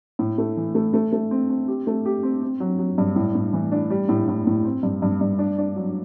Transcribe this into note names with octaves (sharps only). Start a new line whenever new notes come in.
A2
A3
E3
A3
A3
A3
C4
C4
G4
A3
G4
C4
C4
F#3
F#3
G2
A2
A2
E3
D4
G3
A2
A2
A2
C4
G2
G2
G2
D4
D4
F#3